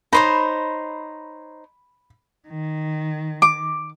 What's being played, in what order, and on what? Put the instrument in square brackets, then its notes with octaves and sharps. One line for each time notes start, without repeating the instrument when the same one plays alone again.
[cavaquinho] D#4 C5 C#5 [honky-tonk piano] B5
[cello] D#3
[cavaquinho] D6